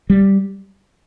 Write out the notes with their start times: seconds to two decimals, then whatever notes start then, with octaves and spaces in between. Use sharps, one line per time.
0.10 G3